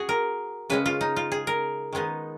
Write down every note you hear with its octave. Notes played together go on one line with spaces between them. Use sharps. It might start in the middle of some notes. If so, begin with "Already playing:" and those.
Already playing: F#4 G#4
A#4
C#3 G#3 C#4 B4
F4
D#4
F4
G#4
A#4
D#3 G#3 B3 D#4